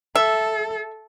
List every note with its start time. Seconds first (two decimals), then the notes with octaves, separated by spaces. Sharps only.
0.15 A4 E5